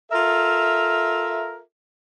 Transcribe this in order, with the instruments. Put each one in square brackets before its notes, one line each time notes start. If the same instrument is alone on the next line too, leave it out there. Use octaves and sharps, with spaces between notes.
[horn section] F4 A4 A#4 E5